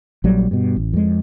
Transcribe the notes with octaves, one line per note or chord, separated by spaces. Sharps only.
A#1 F#3 G3
G2 B2
A1
F2 G#3